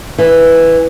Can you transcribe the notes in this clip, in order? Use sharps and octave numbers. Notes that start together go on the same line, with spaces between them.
E3